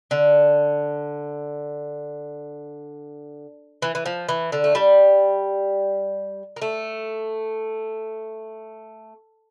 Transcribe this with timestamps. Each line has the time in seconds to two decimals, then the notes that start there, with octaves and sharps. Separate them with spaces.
0.11 D3
3.82 E3
3.95 E3
4.06 F3
4.29 E3
4.52 D3
4.64 A3
4.75 G3
6.56 A#3
6.62 A3